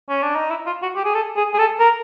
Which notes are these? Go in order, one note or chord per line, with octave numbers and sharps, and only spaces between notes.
C#4
D4
D#4
E4
F4
F#4
G4
G#4
A4
G#4
G#4
A4
A#4